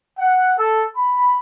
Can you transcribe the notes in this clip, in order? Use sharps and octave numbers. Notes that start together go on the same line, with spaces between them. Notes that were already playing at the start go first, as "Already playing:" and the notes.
F#5
A4
B5